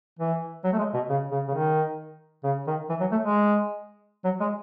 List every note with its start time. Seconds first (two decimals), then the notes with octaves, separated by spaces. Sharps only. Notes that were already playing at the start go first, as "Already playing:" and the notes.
0.19 E3
0.64 F#3
0.73 A3
0.78 G#3
0.94 B2
1.10 C#3
1.31 C#3
1.48 C#3
1.54 D#3
2.44 C#3
2.67 D#3
2.89 E3
3.00 F#3
3.12 A3
3.23 G#3
4.24 F#3
4.40 G#3